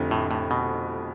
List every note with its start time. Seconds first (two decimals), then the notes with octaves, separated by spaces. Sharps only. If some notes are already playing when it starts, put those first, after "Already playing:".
Already playing: F1 F2 D3 F3
0.11 A2
0.31 A2
0.51 B2